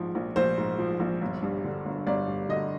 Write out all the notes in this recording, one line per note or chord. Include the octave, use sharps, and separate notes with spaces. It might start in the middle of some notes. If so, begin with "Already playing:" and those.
Already playing: A#1 G#2 F3
A#1
A#1 C5
G#2
F3
A#1
G1
G2
D3
G1
G1 D5
G2
D3 D#5